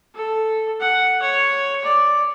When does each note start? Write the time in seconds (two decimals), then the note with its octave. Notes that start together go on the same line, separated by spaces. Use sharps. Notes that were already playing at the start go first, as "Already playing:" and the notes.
0.15 A4
0.81 F#5
1.22 C#5
1.84 D5